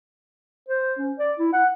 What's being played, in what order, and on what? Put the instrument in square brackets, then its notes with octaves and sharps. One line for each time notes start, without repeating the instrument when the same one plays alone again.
[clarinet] C5
C#4
D5
E4
F#5